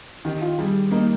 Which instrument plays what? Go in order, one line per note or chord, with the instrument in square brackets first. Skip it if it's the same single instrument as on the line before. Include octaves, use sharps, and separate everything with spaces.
[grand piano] D#3 [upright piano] G4
[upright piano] F4
[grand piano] G3 [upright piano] G#4
[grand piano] A#3 [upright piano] D#4